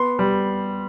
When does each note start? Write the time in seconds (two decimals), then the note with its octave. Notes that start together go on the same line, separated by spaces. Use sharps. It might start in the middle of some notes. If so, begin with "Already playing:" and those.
Already playing: B3 C6
0.19 G3